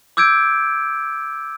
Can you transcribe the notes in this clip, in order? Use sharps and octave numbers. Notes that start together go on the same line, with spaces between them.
D6 E6 G6 G#6 D7